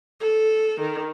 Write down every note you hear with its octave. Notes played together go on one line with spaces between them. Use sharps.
A4
D#3